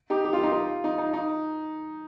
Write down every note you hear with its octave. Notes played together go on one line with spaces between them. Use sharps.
D#4 G4
G4
F4
D#4
F4
D#4
D#4
D#4